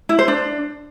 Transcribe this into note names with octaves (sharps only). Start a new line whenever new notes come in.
E4
C5
D4